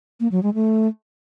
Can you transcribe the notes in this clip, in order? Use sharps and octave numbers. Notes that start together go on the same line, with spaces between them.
A#3
F#3
G#3
A3